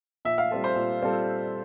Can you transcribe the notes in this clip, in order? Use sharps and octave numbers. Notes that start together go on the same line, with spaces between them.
A#2 E5
F5
G3 C4 F4 A4
C5
A#2
G3 C4 F4 A4